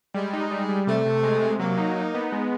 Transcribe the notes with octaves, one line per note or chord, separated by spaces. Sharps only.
G3 G#3
D#4
G3
G3
C3 A3
C3
G#3
C3
F#3 A#3
D#4
D#4
B3
G#3